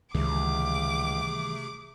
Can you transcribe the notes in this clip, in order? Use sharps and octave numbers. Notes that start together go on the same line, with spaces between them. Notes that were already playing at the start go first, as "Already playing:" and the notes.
C#2 C3 D#3 E3 G3 A3 G#4 D6